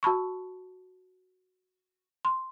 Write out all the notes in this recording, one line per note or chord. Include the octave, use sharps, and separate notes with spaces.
F#4 A5 B5 C#6
C6